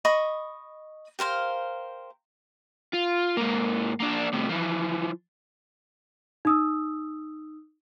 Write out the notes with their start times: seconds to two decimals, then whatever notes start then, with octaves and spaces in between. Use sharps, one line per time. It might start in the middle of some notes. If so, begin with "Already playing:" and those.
0.05 D#5 B5 C#6 D#6
1.19 G4 A#4 C5 F5
2.93 F4
3.37 G#2 A#3
4.00 A#3 D4
4.33 A2 C3
4.50 E3 F3
6.45 D#4 D#6 E6